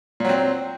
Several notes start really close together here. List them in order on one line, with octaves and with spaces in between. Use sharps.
A#2 F#3 C4